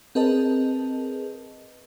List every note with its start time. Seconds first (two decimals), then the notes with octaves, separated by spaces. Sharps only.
0.15 C4 G#4 A#4 B4 D#5 A5